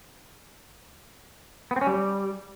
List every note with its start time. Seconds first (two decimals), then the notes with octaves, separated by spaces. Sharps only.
1.71 B3
1.76 C4
1.81 C#4
1.87 G3